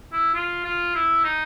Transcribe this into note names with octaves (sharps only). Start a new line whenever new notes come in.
E4
F4
F4
E4
D#4